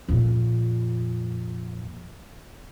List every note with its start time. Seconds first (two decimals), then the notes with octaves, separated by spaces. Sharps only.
0.08 F2 A#2